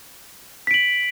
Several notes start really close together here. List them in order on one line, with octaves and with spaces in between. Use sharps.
B6 D7 F#7